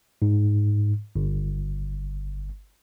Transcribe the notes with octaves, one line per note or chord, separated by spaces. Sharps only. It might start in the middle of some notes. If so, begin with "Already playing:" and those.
G#2
G1